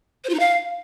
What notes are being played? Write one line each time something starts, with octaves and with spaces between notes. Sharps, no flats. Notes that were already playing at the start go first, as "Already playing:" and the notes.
C5
F4
D#4
F5